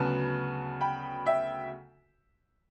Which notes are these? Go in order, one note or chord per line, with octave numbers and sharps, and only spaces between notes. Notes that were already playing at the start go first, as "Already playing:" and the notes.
Already playing: D2 C#3 F#3 B3 A5
G5 B5
E5 G5